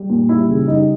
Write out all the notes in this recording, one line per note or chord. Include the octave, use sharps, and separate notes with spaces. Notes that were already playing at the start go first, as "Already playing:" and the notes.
Already playing: G3
A#2
G3 E4
C#3
G3 D#4